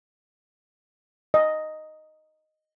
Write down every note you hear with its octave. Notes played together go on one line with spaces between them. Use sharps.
D#5